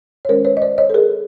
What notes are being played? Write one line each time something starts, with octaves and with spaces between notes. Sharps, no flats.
C#5
D#3 G#3 C#4 A#4 C5
B4 C#5
D#5
C5 D5
C#5 D#5
A4
G#4 A#4